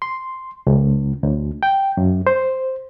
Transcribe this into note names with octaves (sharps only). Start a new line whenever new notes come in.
C6
C#2
D2
G5
F#2
C5